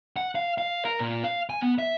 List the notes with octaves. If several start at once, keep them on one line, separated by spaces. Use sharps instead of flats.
F#5
F5
F5
A#4
A#2
F5
G#5
B3
E5